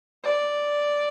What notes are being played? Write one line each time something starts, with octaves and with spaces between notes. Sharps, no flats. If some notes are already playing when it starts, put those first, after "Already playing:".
D5